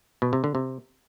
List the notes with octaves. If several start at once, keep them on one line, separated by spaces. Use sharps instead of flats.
B2
C3
D3
C3